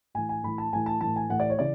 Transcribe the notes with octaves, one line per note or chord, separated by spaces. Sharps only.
A2 E3 G#5
G#5
A2 E3 B5
A5
A2 E3 G#5
A5
A2 E3 A5
G#5
A2 E3 F#5
D5
C#5
C#3 E3 D5